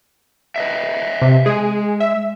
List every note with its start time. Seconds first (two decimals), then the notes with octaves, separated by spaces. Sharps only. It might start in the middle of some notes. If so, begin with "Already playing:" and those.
0.56 B4 D#5 E5
1.22 C3
1.46 G#3 G#4
2.00 E5